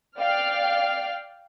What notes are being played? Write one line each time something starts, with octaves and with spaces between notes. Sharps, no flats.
D5 F5 G5 F6